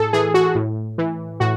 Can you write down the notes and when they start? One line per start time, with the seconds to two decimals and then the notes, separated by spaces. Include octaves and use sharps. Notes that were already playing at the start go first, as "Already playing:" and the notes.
Already playing: A2 G#4 A4
0.13 E3 G#4
0.34 F#4
0.55 A2
0.98 E3
1.40 A2 F#4